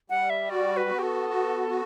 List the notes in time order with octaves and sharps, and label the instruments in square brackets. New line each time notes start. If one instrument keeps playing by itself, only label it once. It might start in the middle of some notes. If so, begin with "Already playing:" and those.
[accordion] G3 [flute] F#5
[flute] E5
[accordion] F#4 [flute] D5
[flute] B4
[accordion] B3
[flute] G4
A4
[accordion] F#4
F#4